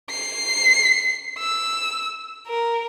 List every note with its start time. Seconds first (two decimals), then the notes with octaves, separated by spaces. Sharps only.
0.10 C7
1.39 E6
2.47 A#4